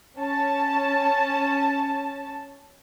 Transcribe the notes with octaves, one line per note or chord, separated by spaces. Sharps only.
C#4 A5